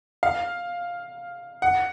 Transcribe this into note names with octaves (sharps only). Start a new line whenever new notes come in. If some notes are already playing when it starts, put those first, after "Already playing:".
F5
F#5